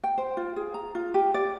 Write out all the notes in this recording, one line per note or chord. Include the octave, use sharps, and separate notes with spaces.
G5
C5
F4
G#4
A#5
F4
G4
D5